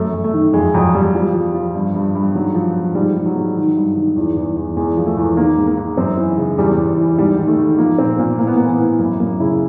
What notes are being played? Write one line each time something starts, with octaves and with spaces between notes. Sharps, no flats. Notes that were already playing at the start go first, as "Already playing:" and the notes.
Already playing: F#2 A3
F#2
A3
D#3
F2 G#3
F2 F#3
F2 G3
F3 G3
F3
F3
G2
G2
G2
G#2 F#3
F3
F3
G#2 G3
G#2
F#3
G#2
D#3
G2
D#3
E2
E2
E2
E2 G#3
F3
A3
E2
D#3 A#3
G#2
A#3
G#2
F#2 C4
E3
C#3
E2 G3
E2
E3
G#2 G3
D#3
A3
D#3
F3 A#3
A#2 C4
A#2 A#3
A2 A#3
B3
E3 A#3
B3
A2
F#2 A#3
F#2 A#3
C#3 E4